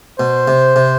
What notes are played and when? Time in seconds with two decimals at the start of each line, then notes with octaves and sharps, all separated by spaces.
0.19 B2 C5
0.48 C3
0.76 C3